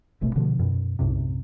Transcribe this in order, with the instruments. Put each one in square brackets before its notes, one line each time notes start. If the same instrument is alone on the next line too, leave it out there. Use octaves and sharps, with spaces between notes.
[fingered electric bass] D1 A1 B2 A3
B2 D3 F3
F#2 B2
B1 F#2 A2 C3